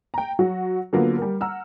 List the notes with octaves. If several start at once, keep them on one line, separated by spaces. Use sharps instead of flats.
G5 A#5
F#3 F#4
D3 F#3 A#3 B3 F4
G3 A#4
F#5 A#5 E6 F6